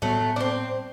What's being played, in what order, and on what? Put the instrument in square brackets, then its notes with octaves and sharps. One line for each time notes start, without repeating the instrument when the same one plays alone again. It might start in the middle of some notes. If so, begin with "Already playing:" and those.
[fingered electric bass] A2 G3 B3 [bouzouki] F#3 A3
[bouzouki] D4
C4